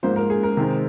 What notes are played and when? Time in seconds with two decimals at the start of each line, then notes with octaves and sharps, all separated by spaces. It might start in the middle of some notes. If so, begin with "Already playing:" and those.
0.03 G#2 F3 A#3 C5
0.16 A#4
0.30 G#4
0.43 A#4
0.57 C3 D#3 G#3 C4